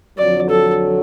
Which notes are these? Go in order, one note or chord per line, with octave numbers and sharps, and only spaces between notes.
F2 D3 F#3 D5
A4